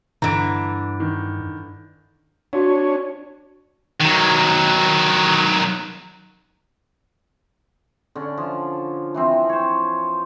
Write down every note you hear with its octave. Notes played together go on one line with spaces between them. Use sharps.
G2 D3 E3 A#5 D7
D#3
D4 F#4 C#5 F5
D#3 F#3
D3 C#4
F3
E3 F3 C4
C5 C#5